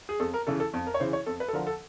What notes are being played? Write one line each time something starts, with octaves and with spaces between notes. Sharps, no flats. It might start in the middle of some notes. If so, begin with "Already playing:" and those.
G#4
F2 A4
A#4
C#3 E3 A4
A4
F2
A#4
C#5
C#3 E3 C5
C#5
F2 A4
B4
A4
D3 F3 A#4
A4